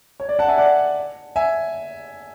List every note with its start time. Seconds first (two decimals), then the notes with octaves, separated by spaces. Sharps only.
0.20 C#5
0.29 D5
0.39 F#5 A5
0.48 E5 G#5
0.58 D5 F#5
1.36 E5 G#5